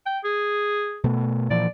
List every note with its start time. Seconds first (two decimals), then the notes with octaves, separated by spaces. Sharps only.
0.06 G5
0.24 G#4
1.04 B2 A3
1.51 A#2 E3 F3 D5